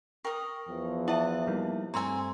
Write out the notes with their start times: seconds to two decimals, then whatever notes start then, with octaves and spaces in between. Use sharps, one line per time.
0.25 A#4 G5 C#6 D#6
0.68 E2 E3 F3
1.08 E4 E5 F#5 A5
1.47 G3 A#3 D#4
1.94 G2 A3 C4 C#5 G#5 A#5 C6 E6